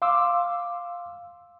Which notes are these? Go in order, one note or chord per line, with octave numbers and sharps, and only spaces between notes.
F5 C6 D6 E6